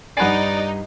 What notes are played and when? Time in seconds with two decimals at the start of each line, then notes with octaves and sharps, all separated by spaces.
0.17 G2 D#4 D5 F#5 G#5 B5 C7